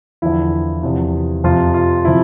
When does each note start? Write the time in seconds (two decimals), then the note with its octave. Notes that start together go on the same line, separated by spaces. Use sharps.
0.22 E2 D3 F3 E4
0.83 E2 C3 F3
1.44 F2 C3 F3 F4
1.74 F4
2.05 C3 F3 E4